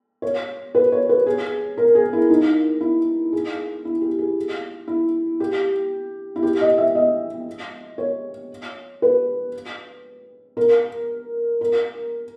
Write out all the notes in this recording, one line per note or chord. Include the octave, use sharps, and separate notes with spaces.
C#5
B4
C#5
B4
G#4
A#4
G#4
E4
D#4
E4
G#4
E4
G4
G#4
E4
G4
E4
G4
D#5
E5
D#5
C#5
B4
A#4
A#4